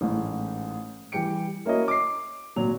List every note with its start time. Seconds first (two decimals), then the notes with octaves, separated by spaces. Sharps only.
0.01 A1 G#2
1.12 E3 G3 G4 G5 C#7 D7
1.66 A#3 C#4 E4 F#4 C#5 D#5
1.88 D6 C7
2.56 G#1 A#2 F#3 F7